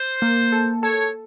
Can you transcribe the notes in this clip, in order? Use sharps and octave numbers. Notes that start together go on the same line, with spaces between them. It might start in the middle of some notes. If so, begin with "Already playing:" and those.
Already playing: C5
A#3
A4
A4 C#5